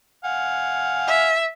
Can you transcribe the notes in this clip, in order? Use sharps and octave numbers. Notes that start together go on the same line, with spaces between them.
F5 F#5 G#5
E5